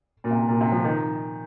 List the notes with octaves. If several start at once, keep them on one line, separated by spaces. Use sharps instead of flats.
A#2
C3
A#2
C3
F3
D#3